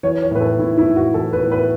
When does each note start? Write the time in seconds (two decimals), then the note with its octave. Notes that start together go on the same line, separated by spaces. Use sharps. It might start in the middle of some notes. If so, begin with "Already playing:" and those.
0.03 E3 C#5
0.22 C#5
0.31 A2 B4
0.40 A4
0.59 A2 E4
0.78 E4
0.87 A2
0.96 F#4
1.14 E3 A4
1.33 B4
1.43 A2
1.52 B4